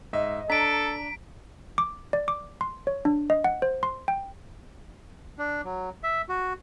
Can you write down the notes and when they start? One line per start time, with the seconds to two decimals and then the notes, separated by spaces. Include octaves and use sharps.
0.13 G#2 D#5 E5
0.50 D4 A4 A#5 B6 D7
1.78 D6
2.13 D5
2.28 D6
2.61 C6
2.87 C#5
3.05 D4
3.30 D#5
3.44 F#5
3.62 C5
3.83 C6
4.08 G5
5.38 D4
5.64 F#3
6.03 E5
6.29 F#4